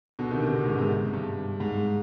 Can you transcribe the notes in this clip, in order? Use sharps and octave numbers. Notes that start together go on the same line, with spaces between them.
B2 D3
C3 D#3
C3 D#3
B2 D3
G#2 C3
G#2 C3
G2
G#2